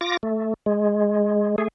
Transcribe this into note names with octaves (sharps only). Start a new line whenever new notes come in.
F4 D6 A#6
A3
G#3
A3 G#4